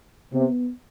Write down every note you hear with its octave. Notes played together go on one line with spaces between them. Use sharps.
C3 B3